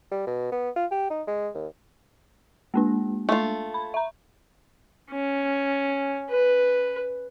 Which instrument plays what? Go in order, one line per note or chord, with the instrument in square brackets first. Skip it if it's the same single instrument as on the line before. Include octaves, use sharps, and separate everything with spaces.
[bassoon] G3
B2
B3
F4
G4
D#4
G#3
D#2
[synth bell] G#3 A#3 D4
[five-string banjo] A3 F4
[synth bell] B5
E5 A#5
[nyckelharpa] C#4
B4